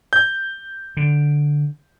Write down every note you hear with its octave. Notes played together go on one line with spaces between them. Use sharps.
G6
D3